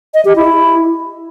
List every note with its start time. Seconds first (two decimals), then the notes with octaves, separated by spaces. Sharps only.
0.14 D#5
0.25 G4
0.36 E4